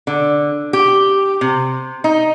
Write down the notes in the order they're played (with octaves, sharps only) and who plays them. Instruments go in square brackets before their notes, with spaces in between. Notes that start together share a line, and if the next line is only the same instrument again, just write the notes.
[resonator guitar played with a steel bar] D3
G4
C3
D#4